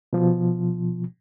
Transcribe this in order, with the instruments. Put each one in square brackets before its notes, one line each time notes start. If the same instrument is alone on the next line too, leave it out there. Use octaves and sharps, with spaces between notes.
[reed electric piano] B2 F3